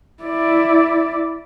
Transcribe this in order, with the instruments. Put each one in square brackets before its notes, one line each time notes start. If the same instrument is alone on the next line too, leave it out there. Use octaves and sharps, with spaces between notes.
[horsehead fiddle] E4 D5